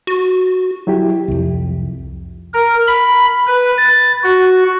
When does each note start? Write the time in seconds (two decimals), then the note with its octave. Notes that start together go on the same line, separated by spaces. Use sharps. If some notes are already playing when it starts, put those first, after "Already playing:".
0.07 F#4
0.87 F#3 E4 G4
1.28 C2 F2
2.54 A#4
2.88 B5
3.47 B4
3.77 A6
4.24 F#4